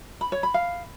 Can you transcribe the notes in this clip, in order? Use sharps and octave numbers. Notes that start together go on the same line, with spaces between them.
B5
C#5
B5
F5